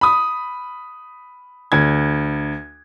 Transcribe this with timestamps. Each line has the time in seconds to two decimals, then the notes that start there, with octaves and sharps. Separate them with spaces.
0.01 B5 D#6
1.72 D2 G#6